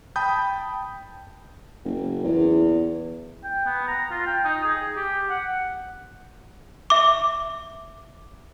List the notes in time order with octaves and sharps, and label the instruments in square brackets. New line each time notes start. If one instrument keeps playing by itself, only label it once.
[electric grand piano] G5 A5 B5 D#6 G6
[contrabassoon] F#1
E2
[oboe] G5
B3
A#5
F4
G5
D#4
G#4
G4
F#5
[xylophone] E5 D6